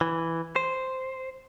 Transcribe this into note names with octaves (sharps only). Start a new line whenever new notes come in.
E3
C5